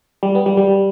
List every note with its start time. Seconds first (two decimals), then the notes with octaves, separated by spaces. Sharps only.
0.23 G3
0.35 B3
0.46 G3
0.57 G3